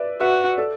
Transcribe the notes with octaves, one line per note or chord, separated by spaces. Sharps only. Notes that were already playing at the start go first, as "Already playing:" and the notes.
Already playing: B4 D5 E5
F#4 B4 E5
A4 D5